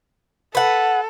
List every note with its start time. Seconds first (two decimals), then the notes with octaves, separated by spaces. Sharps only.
0.55 A4 B4 F#5